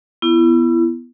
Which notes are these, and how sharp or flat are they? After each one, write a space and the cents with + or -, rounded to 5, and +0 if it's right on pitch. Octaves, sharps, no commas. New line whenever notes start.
B3 +0 E4 +30